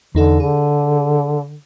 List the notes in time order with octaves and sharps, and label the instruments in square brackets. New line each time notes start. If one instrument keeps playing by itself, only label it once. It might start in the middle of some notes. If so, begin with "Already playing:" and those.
[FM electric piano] E2 D#4 A4 [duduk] D3
[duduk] D3 [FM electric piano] G#4